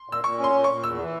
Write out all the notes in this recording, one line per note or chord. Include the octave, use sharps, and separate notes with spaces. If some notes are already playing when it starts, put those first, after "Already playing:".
Already playing: C6
A#2 E6
A#2 C#6
C#4 C6
A#2
A#2 C#6
E2 E6
E3